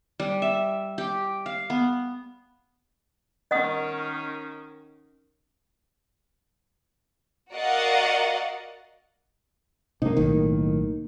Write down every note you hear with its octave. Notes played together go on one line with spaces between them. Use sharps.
G3
E5
G4
F5
B3
D#3 C#4 D#5 F#5 D#6
F#4 A#4 D5 D#5 F5 F#5
C3 A#3 D#4
B1 A2 D#3